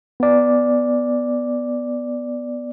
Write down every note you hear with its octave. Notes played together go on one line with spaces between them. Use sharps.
B3 D5